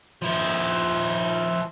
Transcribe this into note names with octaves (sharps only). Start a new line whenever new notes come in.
F3 E4